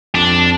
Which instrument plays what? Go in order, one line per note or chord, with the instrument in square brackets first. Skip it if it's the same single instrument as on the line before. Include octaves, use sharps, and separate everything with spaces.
[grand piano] F2 [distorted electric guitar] D4